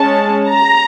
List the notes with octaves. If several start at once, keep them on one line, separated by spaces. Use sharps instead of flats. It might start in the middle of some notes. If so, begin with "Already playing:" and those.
Already playing: G#3 C#4 A5
A#5